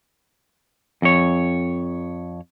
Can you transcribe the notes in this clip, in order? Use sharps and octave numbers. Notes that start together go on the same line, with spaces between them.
F2 C#5